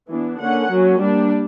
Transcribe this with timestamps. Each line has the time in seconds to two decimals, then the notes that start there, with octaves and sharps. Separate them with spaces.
0.09 E3 B3 D4
0.40 D3 A#3 C#4 F#5
0.71 F#3 A#3 C#4
1.01 G3 A#3 D4